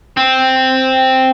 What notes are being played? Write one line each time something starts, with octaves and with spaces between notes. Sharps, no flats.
C4